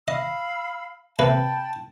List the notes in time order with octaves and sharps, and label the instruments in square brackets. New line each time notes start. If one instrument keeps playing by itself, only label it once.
[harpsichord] D#5 [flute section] F5 B5 E6
[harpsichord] C3 A#3 B4 [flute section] G5 A5 B5